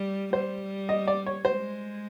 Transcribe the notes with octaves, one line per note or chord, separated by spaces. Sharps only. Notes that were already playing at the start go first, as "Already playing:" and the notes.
Already playing: G3
G3 C5
D#5
D5
C#5
G#3 C5